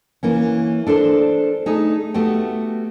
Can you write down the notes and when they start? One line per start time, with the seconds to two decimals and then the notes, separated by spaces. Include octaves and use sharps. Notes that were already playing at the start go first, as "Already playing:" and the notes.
0.23 E3 A#3 C#4
0.87 D4 A4 A#4 C5
1.66 A3 D#4 G#4
2.14 A3 B3 F#4 G4